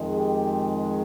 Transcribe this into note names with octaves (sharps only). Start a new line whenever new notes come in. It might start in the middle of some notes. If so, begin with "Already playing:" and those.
Already playing: F2 D#3 G#3
G4